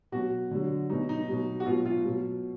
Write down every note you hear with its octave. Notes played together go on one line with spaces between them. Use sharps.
B2 F#3 F#4
D3 F#3
B2 F#3 D#4
D#4
B2 F#3
F#4
B2 F#3 F4
F4
B2 F#3